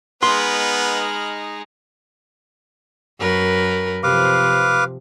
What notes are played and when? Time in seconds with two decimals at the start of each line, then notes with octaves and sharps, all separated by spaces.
0.23 G#3 B3 D#4 B5 C6 F6
3.20 F#2 A#4 B4
4.03 C3 F3 B4 F5 D6